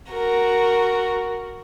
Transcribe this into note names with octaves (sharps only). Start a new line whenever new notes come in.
F#4 A#4